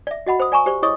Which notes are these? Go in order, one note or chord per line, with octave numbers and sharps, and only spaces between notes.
D5 E5
F#4 D#5 F#5 B5
C5 D#6
D5 G#5 A#5 C#6
G4 C5 D5 C#6
E4 G#4 C#5 D#5 C#6 D#6